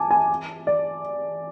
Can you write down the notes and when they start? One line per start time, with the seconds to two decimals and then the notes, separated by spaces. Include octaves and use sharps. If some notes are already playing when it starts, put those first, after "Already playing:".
Already playing: G#5 A5 D6
0.11 G#5
0.67 D5